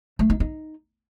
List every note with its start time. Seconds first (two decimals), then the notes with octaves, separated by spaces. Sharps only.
0.19 A3
0.30 D#4
0.40 D#4